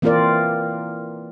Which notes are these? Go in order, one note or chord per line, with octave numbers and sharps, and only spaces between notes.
E3 A#3 C4 F4 A#4 D5